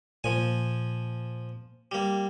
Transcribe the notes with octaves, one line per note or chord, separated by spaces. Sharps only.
A#2 F3 G#5
G3 A#3